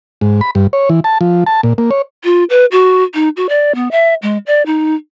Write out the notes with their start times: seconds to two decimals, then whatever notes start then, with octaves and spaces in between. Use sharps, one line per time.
0.21 G#2
0.41 B5
0.55 G2
0.73 C#5
0.89 E3
1.04 A5
1.21 F3
1.46 A5
1.63 A#2
1.78 A#3
1.91 C#5
2.24 F4
2.50 B4
2.72 F#4
3.14 D#4
3.37 F#4
3.49 D5
3.75 B3
3.91 E5
4.22 G#3
4.47 D5
4.66 D#4